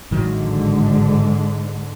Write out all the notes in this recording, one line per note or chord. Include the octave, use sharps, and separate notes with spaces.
A1 G#2 D3 D#3 F#3